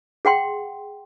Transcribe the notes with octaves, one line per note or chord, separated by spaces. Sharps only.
G#4 F#5 G5 C6